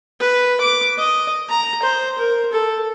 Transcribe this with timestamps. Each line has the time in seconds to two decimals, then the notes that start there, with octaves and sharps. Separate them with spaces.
0.20 B4
0.61 D6
0.98 D#5
1.50 A#5
1.83 C5
2.18 A#4
2.52 A4